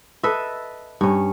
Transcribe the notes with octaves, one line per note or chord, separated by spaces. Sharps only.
A4 B4 D#5 E5
G2 C#4